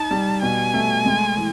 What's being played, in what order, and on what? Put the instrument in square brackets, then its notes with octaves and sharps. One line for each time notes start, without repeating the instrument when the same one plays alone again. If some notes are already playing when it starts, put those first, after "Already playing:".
Already playing: [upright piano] D#4 [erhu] A5
[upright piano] G3
[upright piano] B2 [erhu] G#5
[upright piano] A3
G#3
E3